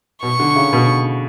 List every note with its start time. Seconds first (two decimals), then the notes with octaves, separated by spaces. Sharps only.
0.23 B2 C#6
0.40 D3
0.56 C#3
0.73 B2